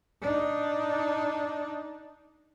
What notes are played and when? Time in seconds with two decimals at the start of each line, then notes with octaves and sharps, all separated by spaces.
0.22 D4 D#4